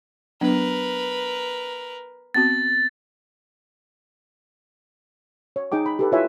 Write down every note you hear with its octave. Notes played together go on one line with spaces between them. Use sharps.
F#3 B3 D4 A#4 B4
B3 C4 F#4 A6
C#5
D#4 G#4 G5 D6
B5
G4 A4 B4
E4 F4 B4 C#5 E5 G#5